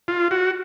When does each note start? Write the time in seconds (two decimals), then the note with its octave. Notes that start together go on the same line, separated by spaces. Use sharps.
0.08 F4
0.31 F#4